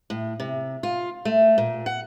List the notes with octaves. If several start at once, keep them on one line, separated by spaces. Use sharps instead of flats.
A2
C3
F4
A3
A#2
F#5